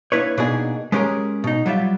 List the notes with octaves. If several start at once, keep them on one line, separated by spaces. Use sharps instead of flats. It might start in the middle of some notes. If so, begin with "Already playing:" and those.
A#3 D4 E4 B4 C#5
B2 A#3 D4 D#4 G#4
G#3 B3 C#4 G4 G#4 A#4
B2 D#4
F#3 G3 F4 E5